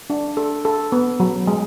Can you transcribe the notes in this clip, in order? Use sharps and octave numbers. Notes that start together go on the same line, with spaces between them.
D4
A4
A4
B3
F#3
G#3